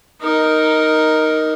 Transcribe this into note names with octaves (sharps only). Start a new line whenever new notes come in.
D#4 A#4